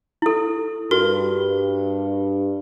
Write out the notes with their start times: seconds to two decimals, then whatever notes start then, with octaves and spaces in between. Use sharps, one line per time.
0.22 E4 A4
0.91 G2 F#4 A#4